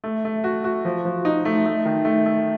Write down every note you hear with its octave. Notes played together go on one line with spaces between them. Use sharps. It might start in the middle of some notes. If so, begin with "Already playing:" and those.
A3
A3
F#4
F#4
F3
F3
D#4
A3
A3
D#3
A3
A3